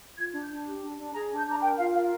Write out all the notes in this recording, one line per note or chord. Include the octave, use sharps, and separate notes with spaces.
F4 G#6
D4
G6
D4
G4
D4
D4
G#4 A#5
D4
G6
D4 A#5
A#4 G5
F4 F5
A#4 F5